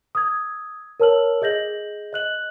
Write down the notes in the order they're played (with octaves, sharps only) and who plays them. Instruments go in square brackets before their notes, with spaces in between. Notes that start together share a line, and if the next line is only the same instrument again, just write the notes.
[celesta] D#6 E6 G#6
A#4 C#5 A5 E6 F6 F#7
G#4 D#5 G6 A#6 F#7
D#5 F#6 F#7